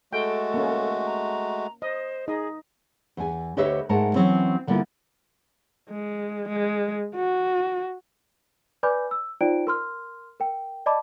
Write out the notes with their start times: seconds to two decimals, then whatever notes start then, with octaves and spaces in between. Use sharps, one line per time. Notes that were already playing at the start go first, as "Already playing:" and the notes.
0.13 G#3 A3 F#4 A4 G5
0.54 A#3 C#4
1.06 A#5
1.82 C5 D#5
2.28 D#4 G#4 D#5
3.17 E2 G#5
3.57 D2 G4 B4 C#5 D#5 E5
3.89 G#2 G#3 A3 A#4 F#5 A5
4.14 E3 F#3 C4 C#4 E4
4.67 D3 G3 A#3 B3 E4 F4
5.90 G#3
6.49 G#3
7.16 F#4
8.83 B4 D5 G#5 B5 D6 G6
9.11 E6
9.41 D#4 F4 C5 D5 G5 D7
9.67 A#4 C6 F6
10.40 A#4 G5
10.86 D5 D#5 A5 B5 D6